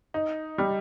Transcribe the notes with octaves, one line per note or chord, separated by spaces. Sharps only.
D#4
G3